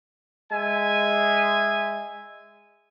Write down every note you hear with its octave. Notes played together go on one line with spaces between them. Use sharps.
G#3 E5 G#5